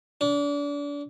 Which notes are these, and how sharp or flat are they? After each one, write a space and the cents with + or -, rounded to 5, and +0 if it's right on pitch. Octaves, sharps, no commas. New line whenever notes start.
D4 -35